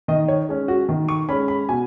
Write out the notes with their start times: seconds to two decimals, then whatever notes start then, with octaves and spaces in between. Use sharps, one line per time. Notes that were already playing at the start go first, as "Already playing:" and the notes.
0.08 D#3 D#5
0.28 C#5
0.49 G#3 C#4
0.68 F#4
0.89 D#3
1.09 C#6
1.29 G#3 C#4 B5
1.48 B5
1.69 B2 G#5